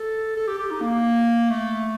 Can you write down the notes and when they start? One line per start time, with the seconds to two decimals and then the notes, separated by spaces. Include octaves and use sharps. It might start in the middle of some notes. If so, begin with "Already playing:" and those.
Already playing: A4
0.36 A4
0.48 G4
0.59 G4
0.71 D#4
0.81 A#3
1.50 A3